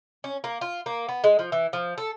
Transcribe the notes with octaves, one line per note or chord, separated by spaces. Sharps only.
C#4
A#3
F4
A#3
B3
G#3
F3
E3
F3
A4